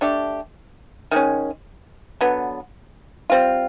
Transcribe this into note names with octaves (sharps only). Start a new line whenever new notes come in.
A3 D4 G4
D#3 G#3 C#4
D3 F#3 B3
G3 C4 F4